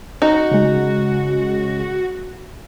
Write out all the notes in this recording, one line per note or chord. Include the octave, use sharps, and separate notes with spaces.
D#4 F#4
C#3 G#3